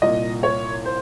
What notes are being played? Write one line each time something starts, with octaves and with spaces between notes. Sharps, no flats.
C2 A#2 D#5
C#5
C5